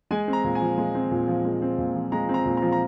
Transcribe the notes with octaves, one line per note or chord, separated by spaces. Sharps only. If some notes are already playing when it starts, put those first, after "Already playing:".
G#3 G#5
C4
A#5
A#2
G#5
F3
G#3
C4
A#2
F3
G#3
C4
A#2
F3
G#3 A#5
C4
A#5
A#2
A#5
F3
A#5